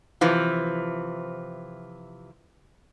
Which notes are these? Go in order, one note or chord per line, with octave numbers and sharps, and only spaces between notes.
C3 E3 F3